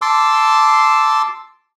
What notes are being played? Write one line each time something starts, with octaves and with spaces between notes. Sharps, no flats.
A5 C6 D6 E6